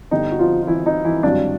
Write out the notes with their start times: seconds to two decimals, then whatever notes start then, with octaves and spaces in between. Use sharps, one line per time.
0.11 G2 D3 G3 B3 D4 D#4
0.32 F#4
0.39 F3 F4
0.62 F4
0.67 E3 E4
0.86 D#4
1.04 E3 E4
1.23 G#1 G2 D#3 F#3 D4